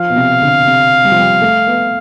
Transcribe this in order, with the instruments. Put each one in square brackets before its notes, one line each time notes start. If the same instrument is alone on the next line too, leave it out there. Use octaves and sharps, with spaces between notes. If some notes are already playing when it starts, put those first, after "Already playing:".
Already playing: [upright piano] F3 [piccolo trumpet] F5
[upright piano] B2
C3
D3
C3
G3
F3
G3
A3
B3